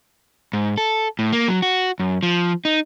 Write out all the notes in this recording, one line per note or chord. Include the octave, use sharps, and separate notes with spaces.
G#2
A4
A2
A#3
F#3
F#4
F#2
F3
D#4